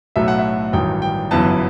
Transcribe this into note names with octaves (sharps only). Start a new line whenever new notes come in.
B1 A2 F#3 A3 E5
F#5
E5
A1 G2 D#3 F#3 G5
G5
G1 F#2 E3 B3 A5